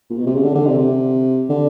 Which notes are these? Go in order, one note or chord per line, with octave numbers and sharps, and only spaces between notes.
A#2
B2
C3
C#3
D3
D3
C3
C3
D3